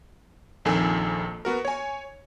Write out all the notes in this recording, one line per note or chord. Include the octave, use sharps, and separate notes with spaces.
A#1 F2 D#3 A4 G#5 C7
B3 F#4 A#4
C#5 G#5